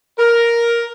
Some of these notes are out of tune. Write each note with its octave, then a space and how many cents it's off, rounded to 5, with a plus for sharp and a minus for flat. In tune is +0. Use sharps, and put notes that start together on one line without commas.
A#4 +5